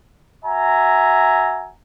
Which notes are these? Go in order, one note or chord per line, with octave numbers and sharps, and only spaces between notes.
F#4 E5 G#5 A#5